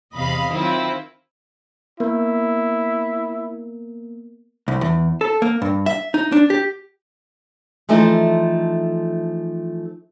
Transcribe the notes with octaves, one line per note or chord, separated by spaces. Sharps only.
E2 C3 D#5 F5 B5
D#3 F#3 C4 E4 F4
A#3 B3 E4 A#4
C2
E2
A4
A#3
G2
E5
D#4
D4
G4
E3 F3 A3 D#4 A4 C5